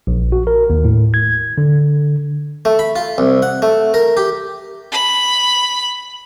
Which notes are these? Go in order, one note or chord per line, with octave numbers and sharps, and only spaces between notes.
A#1
F#4
A#4
D#2
A2
G#6
D3
A3
B5
F4
C2
F#5
A3
A#4
G4
B5